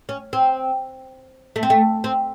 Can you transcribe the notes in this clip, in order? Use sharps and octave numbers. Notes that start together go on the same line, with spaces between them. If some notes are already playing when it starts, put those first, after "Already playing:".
C#4
C4
A3
C4
A3
C4